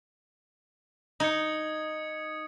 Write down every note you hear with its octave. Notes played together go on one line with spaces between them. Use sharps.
D#4 D#6 G#6 C#7